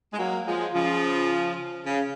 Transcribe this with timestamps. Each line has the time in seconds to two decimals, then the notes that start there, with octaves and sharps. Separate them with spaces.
0.13 G#3
0.18 F#3 A#3
0.46 F3 G#3
0.74 C#3 F3
1.85 C#3